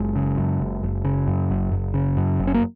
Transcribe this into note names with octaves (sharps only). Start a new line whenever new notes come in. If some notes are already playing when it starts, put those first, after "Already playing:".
Already playing: F#1 G#3
C#3
F#2
F#1
F#1
C#3
F#2
F#1
F#1
C#3
F#2
F#1
C#4
A#3